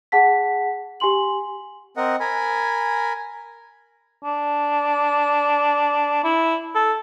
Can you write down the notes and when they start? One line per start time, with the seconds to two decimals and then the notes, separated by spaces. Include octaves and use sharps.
0.12 G#4 F#5 A5 B6
1.00 G4 G#5 C6 F#7
1.97 C4 A#4 D#5 F#5
2.20 A#4 G#5 B5
4.23 D4
6.24 E4
6.75 A4